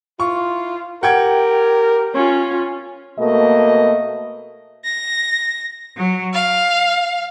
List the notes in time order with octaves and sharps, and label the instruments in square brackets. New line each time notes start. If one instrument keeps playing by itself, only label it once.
[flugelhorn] E4 [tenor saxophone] F4 [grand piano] C#6
[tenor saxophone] G4 [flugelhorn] A#4 [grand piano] F#5 G5 G#6
[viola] C#4 F4 [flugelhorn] C#5
[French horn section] B2 A3 A#3 D#5
[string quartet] A#6
F#3
F5